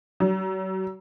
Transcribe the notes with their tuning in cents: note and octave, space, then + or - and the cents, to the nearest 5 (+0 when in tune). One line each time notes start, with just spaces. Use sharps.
F#3 +40